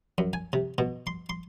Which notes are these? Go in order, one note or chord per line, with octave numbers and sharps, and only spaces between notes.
F#2
G#5
C3
B2
C6
C6